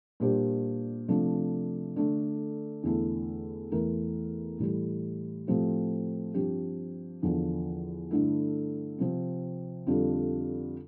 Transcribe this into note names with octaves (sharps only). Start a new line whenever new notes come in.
A#2 G3 D4 G4 C5
C3 F3 A3 D4 A4
D3 A3 D4
E2 D3 A3 E4 A4
E2 E3 A3 E4 A#4
A2 E3 G3
A2 F3 A3 C4 G4
G2 F3 C4 G4
E2 D3 F3
G2 D3 A3 E4
C3 F3 C4
F2 D3 G3 D4 F4